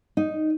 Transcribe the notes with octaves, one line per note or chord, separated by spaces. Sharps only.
D#4